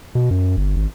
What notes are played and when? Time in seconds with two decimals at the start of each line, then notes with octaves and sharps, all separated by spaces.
0.15 B2
0.31 F#2
0.57 G1
0.76 G#1